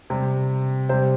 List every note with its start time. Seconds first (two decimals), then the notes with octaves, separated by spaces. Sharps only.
0.10 C3 G3
0.89 C3 G3 C5